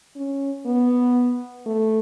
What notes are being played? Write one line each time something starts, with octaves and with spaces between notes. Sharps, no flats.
C#4
B3
A3